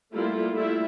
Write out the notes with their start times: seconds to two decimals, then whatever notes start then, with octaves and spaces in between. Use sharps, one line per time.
0.14 G3 A3 A#3 E4 F4 A4
0.54 G3 A3 E4 F4 A4 E5